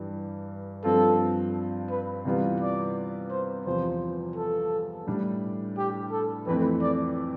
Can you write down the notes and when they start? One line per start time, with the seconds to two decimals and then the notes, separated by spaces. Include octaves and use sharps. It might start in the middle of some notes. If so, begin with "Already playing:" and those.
Already playing: G2 E3 G3
0.84 G2 F3 C4 F4 A4
1.90 B4
2.25 C3 E3 G3 B3 F4
2.61 D5
3.31 C5
3.66 E2 C3 F3 C5
4.36 A4
5.07 A2 G3 D4
5.78 G4
6.12 A4
6.47 F2 E3 A3 C4 B4
6.82 D5